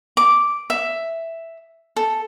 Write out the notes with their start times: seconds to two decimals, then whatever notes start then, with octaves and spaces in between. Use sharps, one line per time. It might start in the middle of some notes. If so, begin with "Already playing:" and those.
0.17 D6
0.70 E5
1.96 A4